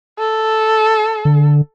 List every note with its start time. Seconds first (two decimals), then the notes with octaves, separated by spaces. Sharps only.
0.19 A4
1.25 D3